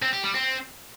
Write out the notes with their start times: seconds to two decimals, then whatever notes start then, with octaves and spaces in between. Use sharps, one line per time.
0.02 C4
0.13 G4
0.24 G3
0.34 C4